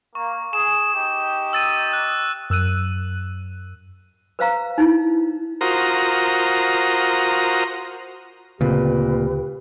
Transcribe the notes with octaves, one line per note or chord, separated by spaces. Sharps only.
A#3 C#6
G#4 E7
D#4 G4
E6 A6 D#7
F#6
F#2 E6 F#6 D#7
B4 C5 F5 A#5
D#4 E4
F4 F#4 A#4 C5 A#5 D#6
D2 A#2 C#3 C4 G4 B4